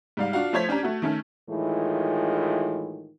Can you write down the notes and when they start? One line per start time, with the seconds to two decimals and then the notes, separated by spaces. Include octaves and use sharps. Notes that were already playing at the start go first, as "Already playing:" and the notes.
0.17 G#2 G3 F5
0.33 D4 F4 F#4 F5
0.53 F3 A3 C5 C#5 G#6 B6
0.69 C#4 D4 G4 A#5
0.83 A3 F#4
1.02 D#3 A3 C#4
1.49 A2 D#3 E3 G#3 F4